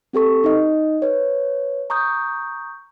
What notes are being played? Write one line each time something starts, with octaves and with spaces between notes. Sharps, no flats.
C4 G4 A4 C#6
D#4 D#5
B4 C#5
A#5 C#6 D#6 G6